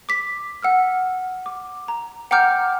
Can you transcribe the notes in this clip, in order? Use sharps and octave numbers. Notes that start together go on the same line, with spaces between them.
D6 B6
F#5 E6 F6
D6
A#5
F#5 G5 A#5 D6 F6 G6